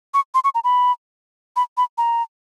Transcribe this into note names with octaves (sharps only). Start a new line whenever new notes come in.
C#6
C6
C#6
A#5
B5
B5
B5
A#5